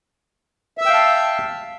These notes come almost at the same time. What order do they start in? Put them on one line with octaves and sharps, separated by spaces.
E5 E6 G5 F5 A5